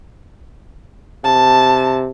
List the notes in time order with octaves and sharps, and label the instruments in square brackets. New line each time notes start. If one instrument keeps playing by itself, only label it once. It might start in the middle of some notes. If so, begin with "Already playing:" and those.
[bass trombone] C3 [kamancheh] A5